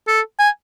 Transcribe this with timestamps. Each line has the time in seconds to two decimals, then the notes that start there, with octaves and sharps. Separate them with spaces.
0.08 A4
0.39 G#5